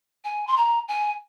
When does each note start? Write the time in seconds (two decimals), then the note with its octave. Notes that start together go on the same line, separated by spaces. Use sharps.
0.24 G#5
0.47 C6
0.57 A#5
0.88 G#5